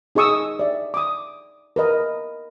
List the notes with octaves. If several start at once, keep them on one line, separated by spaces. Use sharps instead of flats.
D#4 G#4 D#5 C#6 D#6 E6
D5 E5
D6 D#6
A#4 B4 D#5